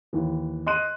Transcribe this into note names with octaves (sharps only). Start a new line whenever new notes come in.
D#2 E3
D#5 C6 F#6 D#7